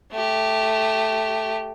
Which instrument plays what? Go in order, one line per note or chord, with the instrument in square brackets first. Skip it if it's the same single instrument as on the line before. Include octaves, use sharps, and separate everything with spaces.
[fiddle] A3 G4